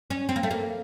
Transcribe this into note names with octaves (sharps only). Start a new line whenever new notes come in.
C#4
C4
A#3
A3
A#3